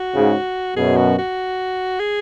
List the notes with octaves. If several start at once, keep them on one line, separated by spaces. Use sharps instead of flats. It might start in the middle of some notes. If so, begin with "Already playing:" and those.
Already playing: F#4
G#2 C#3
F#2 B2 G#4
F#4
F#4
G#4